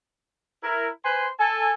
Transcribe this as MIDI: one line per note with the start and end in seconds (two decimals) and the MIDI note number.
0.62 0.89 64
0.62 0.89 70
1.04 1.27 71
1.04 1.27 72
1.04 1.27 80
1.04 1.27 84
1.39 1.73 69
1.39 1.73 80